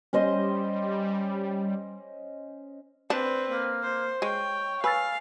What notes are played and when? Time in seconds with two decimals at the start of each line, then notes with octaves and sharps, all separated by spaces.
0.13 G3 C#4 C5 D#5
3.10 C4 D4 B4
3.49 A#3
3.83 C5
4.22 G#3 C#5 G5
4.84 B4 F5 G#5 E6 A6